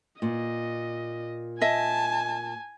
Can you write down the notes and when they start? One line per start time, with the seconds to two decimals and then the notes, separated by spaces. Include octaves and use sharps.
0.22 A#2 D#5
1.61 D#5 E5 G#5 A5